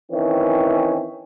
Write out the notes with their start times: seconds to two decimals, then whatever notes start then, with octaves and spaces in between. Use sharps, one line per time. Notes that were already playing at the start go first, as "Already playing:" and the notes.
0.12 D#3 E3 C4 C#4 E4